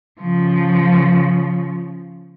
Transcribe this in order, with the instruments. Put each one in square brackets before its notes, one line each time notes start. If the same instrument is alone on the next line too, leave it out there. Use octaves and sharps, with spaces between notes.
[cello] C#3 F3